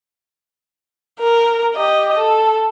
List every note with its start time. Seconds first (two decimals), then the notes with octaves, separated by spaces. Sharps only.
1.20 A#4
1.75 G4 D#5
2.18 A4